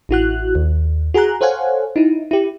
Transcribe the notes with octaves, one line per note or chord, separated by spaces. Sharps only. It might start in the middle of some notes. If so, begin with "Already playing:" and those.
A1 E4 F#4 F#6
D#2
F#4 G#4 G#5 A#5 F#6
A4 C5 C#5 F5 F#5 G#5
D#4 E4
E4 G4